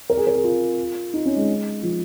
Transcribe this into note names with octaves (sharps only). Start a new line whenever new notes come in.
A#4
G#4
A#4
G#4
F4
D#4
C#4
G#3
F3